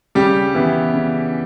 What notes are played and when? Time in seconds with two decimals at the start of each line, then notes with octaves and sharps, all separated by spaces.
0.15 C#3 G3 G4
0.54 E3 B3 E4
0.94 C#3